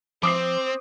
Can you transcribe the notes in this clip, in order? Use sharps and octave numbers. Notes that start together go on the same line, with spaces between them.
F3 C4 C5 D6 D#6 C7